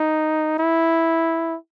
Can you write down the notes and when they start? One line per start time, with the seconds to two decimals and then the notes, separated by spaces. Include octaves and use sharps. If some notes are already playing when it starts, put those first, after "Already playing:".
Already playing: D#4
0.59 E4